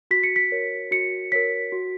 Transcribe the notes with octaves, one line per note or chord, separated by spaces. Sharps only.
F#4 B6
C#7
B6
A#4 C#5
F#4 C#7
A#4 C#5 B6
F#4